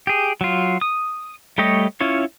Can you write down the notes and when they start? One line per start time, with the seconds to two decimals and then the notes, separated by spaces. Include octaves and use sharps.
0.07 G4 G#4
0.41 F#3 F4
0.81 D#6
1.58 G3 A3 G4 C#5 D#5
2.01 C#4 E4 F4 C#5